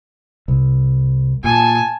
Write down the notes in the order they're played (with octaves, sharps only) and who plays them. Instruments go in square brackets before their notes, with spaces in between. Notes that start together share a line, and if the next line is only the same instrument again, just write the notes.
[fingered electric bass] C2
[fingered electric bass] A#2 [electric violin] G#5 A5